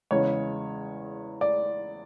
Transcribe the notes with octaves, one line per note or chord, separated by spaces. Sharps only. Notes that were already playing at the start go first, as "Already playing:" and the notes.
E2 C#3 G#3 C#5
D5